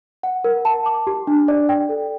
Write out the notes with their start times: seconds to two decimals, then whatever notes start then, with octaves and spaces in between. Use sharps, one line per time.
0.23 F#5
0.44 A#4
0.65 A5
0.86 D6
1.07 G4
1.27 D4
1.48 D5
1.69 G5
1.89 A4